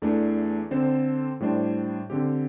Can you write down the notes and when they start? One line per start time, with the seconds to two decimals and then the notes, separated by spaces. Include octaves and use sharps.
0.02 E2 E3 A3 D4 A4
0.71 D3 C4 A4 C5
1.40 A2 G3 D4 C5
2.10 D3 C4 G4